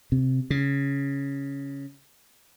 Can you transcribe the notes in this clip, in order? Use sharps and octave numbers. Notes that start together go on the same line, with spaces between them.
C3
C#3